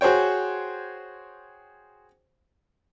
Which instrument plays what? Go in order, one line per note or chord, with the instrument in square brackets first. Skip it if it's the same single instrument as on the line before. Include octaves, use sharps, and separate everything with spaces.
[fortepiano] F#4 G#4 C5 C#5 G5